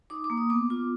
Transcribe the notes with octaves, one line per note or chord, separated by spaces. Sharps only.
D#4 D6
D6
A#3
D#6
B3 D6
F4 D6